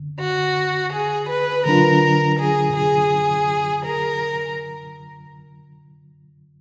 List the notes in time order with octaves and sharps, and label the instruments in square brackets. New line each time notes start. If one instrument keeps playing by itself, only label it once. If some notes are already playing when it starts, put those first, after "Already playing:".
Already playing: [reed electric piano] D3
[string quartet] F#4
G#4
B4
[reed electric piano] D3 F#3 D4 F4 [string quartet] A#4
[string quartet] G#4
G#4
A#4